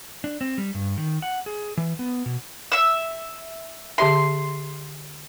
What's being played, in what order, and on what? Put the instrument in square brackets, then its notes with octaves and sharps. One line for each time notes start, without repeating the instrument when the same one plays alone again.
[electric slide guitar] D4
C4
G3
G2
D#3
F#5
G#4
E3
B3
B2
[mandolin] E5 E6
[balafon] D3 G4 E5 [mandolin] C6